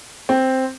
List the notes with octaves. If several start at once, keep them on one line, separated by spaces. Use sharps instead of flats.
C4